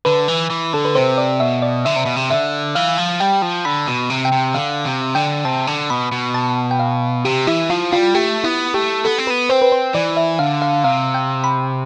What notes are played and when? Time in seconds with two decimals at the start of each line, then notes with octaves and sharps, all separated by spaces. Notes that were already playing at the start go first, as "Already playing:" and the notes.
0.05 D3 B4
0.28 E3
0.50 E3
0.73 D3 A4
0.85 B4
0.95 C3 C5
1.18 D5
1.40 B2 E5
1.62 D5
1.85 D3 E5
1.96 C3
2.06 B2
2.16 C3
2.30 D3 E5
2.75 E3 F5
2.98 F3
3.20 G3 G5
3.42 F3
3.65 D3 B5
3.87 B2
4.10 C3
4.25 G5
4.32 C3
4.54 D3 F5
4.85 C3
5.15 D3 G5
5.45 C3 A5
5.67 D3
5.90 B2 B5
6.12 B2
6.34 A5
6.71 G5
6.79 F5
7.25 C3 G4
7.47 E3 E4
7.70 F3 F4
7.92 G3 F4
8.15 A3 G4
8.44 B3 E4
8.74 A3 G4
9.05 B3 A4
9.18 C4
9.27 B3 B4
9.50 C4 C5
9.62 B4
9.72 C5
9.94 E3 D5
10.17 E5
10.39 D3 F5
10.62 F5
10.84 C3 F5
11.14 G5
11.44 B5